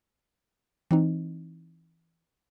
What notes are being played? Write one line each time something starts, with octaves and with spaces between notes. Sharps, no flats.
E3 C4 D#4